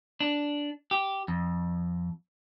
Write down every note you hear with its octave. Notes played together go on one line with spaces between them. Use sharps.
D4
G4
F2